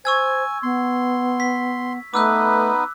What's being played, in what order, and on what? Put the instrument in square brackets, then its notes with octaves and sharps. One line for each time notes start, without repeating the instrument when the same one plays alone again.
[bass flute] C5 [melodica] G#5 [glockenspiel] C#6 E6 G#6
[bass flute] B3 [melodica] C6
[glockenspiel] B6
[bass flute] A3 [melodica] B3 D#4 B4 [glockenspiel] D6 E6 F#6